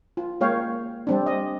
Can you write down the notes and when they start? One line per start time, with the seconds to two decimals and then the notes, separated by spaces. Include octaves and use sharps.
0.17 F4
0.41 G#3 A#3 C#5 F5 G5
1.07 G3 C4 D4
1.26 D#5